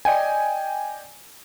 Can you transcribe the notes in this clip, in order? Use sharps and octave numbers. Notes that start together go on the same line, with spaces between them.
D5 D#5 G5 G#5